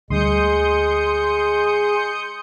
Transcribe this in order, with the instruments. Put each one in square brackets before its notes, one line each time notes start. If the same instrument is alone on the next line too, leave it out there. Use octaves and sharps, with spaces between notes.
[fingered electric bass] D2 G3 [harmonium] G#3 [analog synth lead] C6 [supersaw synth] D#6 G6 C#7